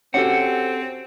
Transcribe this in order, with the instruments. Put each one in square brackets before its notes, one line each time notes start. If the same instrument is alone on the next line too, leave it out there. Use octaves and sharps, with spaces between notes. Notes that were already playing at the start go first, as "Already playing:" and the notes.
[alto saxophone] C4 [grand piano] C#4 F#4 G4 [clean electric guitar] A4 F#5